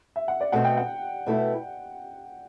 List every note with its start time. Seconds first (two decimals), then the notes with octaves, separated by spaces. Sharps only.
0.16 E5
0.28 F#5
0.41 D5
0.52 B2 A3 C4 F#5
0.64 G5
0.77 F#5
1.27 B2 A3 E4